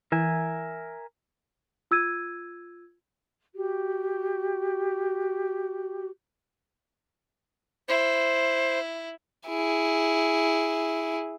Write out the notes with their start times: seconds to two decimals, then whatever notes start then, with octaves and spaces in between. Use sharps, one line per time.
0.12 E3 A#4 E5 G#5
1.91 F4 E6 G#6 D#7
3.53 F#4 G4
7.88 E4 C5
9.49 E4 G#4